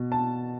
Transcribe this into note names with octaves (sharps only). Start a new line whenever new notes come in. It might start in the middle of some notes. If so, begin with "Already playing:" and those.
Already playing: B2
A5